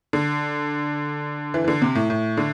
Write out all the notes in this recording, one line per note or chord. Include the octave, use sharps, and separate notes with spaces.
D3
E3
E3
D3
C3
A2
A2
D3